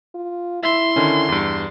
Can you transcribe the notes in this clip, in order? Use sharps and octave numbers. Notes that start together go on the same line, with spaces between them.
F4
E4 E5 C6
D3 D#3 C#4
E2 G2